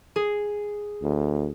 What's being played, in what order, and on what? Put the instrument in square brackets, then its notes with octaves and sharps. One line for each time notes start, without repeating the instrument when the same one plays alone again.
[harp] G#4
[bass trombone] D2